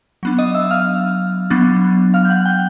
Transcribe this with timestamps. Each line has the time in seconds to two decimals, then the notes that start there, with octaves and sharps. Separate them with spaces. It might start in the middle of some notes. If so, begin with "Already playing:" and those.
0.23 F#3 B3 D4
0.38 D#5 D#6
0.55 E5 E6
0.71 F5 F6
1.50 F#3 B3 D4
2.14 F5 F6
2.25 G6
2.30 F#5 F#6
2.45 G5 G6